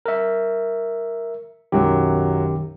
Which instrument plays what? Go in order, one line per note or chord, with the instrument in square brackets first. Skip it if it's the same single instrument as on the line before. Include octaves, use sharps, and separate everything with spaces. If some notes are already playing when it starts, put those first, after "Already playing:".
[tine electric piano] A#4 E5
[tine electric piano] B1 D#3 G4 [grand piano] F#2 F#3